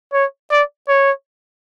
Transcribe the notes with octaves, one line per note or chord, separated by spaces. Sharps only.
C#5
D5
C#5